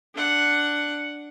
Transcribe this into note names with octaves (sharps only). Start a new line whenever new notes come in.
D4 F#5